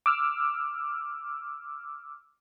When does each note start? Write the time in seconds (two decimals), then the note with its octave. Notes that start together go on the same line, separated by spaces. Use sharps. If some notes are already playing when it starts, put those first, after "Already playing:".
0.06 D6 E6 F6